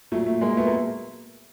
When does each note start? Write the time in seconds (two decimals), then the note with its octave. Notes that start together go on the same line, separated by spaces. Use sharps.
0.12 A#2 F#3 A3
0.26 A3
0.41 G#3 A#3
0.57 A3 B3
0.67 A#3